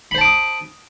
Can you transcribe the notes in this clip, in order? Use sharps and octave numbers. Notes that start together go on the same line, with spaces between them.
C5 A5 B5 D6 D#6